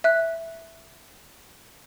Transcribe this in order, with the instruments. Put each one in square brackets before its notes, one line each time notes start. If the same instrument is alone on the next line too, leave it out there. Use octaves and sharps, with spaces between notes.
[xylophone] E5 F#6